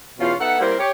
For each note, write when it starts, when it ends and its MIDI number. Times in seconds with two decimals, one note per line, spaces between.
0.18 0.33 40
0.18 0.33 47
0.18 0.33 61
0.18 0.33 65
0.40 0.57 59
0.40 0.57 63
0.40 0.57 69
0.40 0.57 76
0.40 0.57 78
0.59 0.74 55
0.59 0.74 58
0.59 0.74 60
0.59 0.74 64
0.59 0.74 70
0.59 0.74 72
0.78 0.91 67
0.78 0.91 73